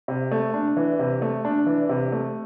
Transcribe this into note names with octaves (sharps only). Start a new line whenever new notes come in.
C3
A3
D4
E3
C3
A3
D4
E3
C3
A3